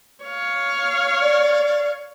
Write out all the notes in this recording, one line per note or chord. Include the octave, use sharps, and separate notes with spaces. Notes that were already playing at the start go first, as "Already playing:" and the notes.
C#5 F5
D5